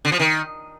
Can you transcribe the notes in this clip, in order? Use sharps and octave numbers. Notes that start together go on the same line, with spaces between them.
D3
F3
D#3